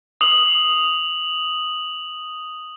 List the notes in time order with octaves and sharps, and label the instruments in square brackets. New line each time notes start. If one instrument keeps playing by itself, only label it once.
[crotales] D#6 F#7